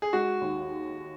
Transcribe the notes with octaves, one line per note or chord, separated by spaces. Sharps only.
G#4
G#3 F#4
D#2